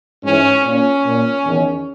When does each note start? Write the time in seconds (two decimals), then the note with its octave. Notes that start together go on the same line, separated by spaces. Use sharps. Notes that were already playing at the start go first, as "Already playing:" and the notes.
0.24 G#2 E3 C#4
0.65 A#2 C#4
1.05 A#2
1.46 E2 D#3